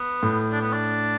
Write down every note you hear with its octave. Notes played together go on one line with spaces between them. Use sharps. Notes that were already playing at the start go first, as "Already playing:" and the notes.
Already playing: B3
A2
D4
B3
D4